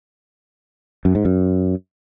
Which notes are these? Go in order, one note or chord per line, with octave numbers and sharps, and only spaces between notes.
F#2
G#2
F#2